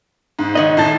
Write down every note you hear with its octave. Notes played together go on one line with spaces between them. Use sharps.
G#2
D#3 C#5 D#5 B5
A2 A5 A6